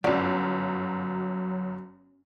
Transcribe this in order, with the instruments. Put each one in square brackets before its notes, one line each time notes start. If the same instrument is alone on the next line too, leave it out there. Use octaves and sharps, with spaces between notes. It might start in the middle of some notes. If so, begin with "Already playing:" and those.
[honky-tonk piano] G1 F#2 [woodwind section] F#3 [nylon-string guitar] C#4 F#4 [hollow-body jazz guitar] D5